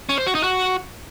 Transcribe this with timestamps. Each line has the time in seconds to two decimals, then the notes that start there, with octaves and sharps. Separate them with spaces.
0.09 C#4
0.18 C5
0.26 F#4
0.35 D#4
0.44 F#4